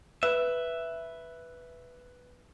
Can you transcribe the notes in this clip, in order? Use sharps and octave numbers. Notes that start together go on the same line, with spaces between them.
B4 E5